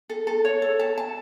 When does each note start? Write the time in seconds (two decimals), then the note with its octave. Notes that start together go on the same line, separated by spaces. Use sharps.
0.09 A4
0.27 A4
0.45 C#5
0.62 A4
0.79 A5
0.98 A5